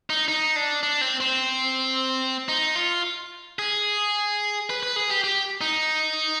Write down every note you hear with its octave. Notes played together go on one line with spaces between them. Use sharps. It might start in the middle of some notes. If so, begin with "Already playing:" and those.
D#4
D#4
D4
D4
C4
C4
D#4
F4
G#4
B4
B4
G#4
G4
G4
D#4